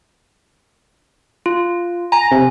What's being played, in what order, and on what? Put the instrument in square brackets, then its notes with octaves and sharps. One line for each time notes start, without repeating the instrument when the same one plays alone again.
[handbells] F4
[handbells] G#5 [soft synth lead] A#5
[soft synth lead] C3